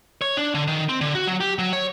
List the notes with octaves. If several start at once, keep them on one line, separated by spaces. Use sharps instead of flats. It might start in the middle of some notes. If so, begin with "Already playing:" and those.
C#5
D4
D3
D#3
C4
D3
F#4
F#3
G4
F#3
C#5